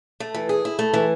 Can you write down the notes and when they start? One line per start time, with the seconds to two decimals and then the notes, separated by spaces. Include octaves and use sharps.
0.20 A3
0.34 E3
0.49 G#4
0.65 E4
0.79 A3
0.94 E3